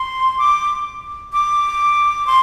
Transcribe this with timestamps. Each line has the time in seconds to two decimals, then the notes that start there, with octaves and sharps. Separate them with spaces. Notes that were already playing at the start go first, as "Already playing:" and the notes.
Already playing: C6
0.38 D6
1.33 D6
2.27 C6